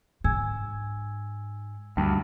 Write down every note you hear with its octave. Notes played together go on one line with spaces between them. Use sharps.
G#2 G#5 E6 G#6
D2 G2